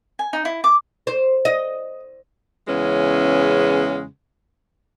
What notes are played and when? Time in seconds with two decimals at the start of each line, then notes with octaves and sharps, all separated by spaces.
0.19 G#5
0.33 D#4
0.45 E4
0.64 D6
1.07 C5
1.45 D#5
2.68 E2 C#3 E3 G#3 C#4